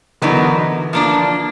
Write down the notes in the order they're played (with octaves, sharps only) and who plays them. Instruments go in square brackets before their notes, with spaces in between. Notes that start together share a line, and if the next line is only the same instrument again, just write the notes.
[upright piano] D3 E3 [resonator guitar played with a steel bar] F#3 B3 D#4 F#4 A#4
[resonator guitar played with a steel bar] F3 A#3 D4